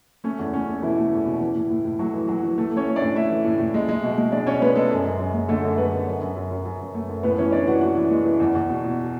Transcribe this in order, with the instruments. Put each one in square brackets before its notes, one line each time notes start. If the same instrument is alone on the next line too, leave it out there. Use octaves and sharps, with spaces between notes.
[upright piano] A3 C#4
E2
A3 C#4
A3
B2 E3 E4
A3
E2
B2
E3
A2
A2
A2
F#3 A3 F#4
E3
E3 F#3 F#4
E3
E3 A3 A4
A3
C#4 C#5
A3
D4 D5
A2
A3 E4 E5
E3
A2
A2
G#3
G#3
B2
G#3
G#3 D4 D5
B2 C#4 C#5
G#3 B3 B4
G#3 A3 A4
F#2
F#2
F#2
G#3
D3 A3 A4
F#2
G#3 B3 B4
F#2
F#2
F#2
F#2
F#2
F#2
F#2
A3
F#2
A2 B3 B4
E3 C#4 C#5
E3 D4 D5
E3 F#4 F#5
E3 F#4 F#5
E3
G#3
E3
E2
E2
B2
B2